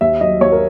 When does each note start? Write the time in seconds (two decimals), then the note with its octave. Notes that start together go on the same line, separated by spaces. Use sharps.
0.01 D#2 E5
0.21 F#3 D#5
0.41 D#2 C#5
0.52 A#4